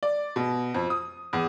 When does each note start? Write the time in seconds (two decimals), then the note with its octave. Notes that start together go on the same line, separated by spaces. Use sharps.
0.03 D5
0.36 B2
0.74 F2
0.90 D#6
1.33 E2